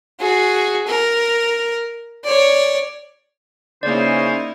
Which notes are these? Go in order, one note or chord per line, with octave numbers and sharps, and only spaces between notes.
F#4 G#4
A#4
C#5 D5
C#3 A#3 C#4 D#4 E4 C5 D5